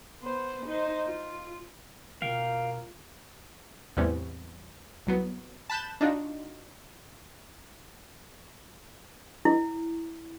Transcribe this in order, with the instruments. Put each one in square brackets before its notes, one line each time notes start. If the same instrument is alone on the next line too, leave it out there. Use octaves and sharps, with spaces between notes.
[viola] B3 C5
D#4 C5
F4
[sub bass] B2 [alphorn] A#3 [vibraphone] F4 [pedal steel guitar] F5 G5
[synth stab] E2 A2 C3 G3 B3 C#4
C2 F#3 B3
A5 B5 F#6 G6 E7
D4 D#4 F4 F#4
[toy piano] E4